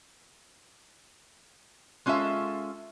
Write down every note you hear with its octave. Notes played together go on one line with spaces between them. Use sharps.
G#3 C#4 F4 A4 E5